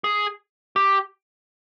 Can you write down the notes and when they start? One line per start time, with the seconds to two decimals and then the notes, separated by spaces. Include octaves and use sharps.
0.04 G#4
0.76 G4